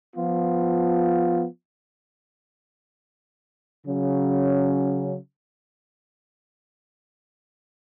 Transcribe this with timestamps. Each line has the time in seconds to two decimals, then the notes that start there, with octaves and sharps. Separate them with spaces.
0.16 F3 B3 F4
3.85 C#3 F#3 C#4